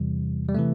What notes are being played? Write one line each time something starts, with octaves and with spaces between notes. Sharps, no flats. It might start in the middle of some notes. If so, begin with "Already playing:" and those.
Already playing: E2 C3 E3 G3
G3
C3 E3 A3